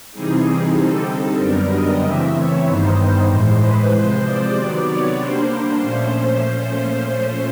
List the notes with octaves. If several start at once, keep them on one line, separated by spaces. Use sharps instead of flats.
C3 E3 G3 C4 D#4 G#4
G#4
D3 G3 C4 D#4 A4
F#2 D3 G3 B3 D4 A#4
D#5
C#3 E3 A3 C4 E5
C#5
G2 D#3 G3 B3 D#4 C5
A2 E3 G#3
B4
C3 F3 G#3 C5
D5
C3 D#3 F#3 B3
C#5
D3 G3 A#3 D4 C5
A#2 F3 A3 C#4